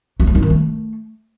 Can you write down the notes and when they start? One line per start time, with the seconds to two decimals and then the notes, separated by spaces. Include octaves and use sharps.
0.20 F#3
0.27 A3
0.35 D#4
0.42 D#3
0.50 A3